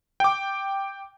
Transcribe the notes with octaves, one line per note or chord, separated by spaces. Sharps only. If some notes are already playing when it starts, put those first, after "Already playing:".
G5 D6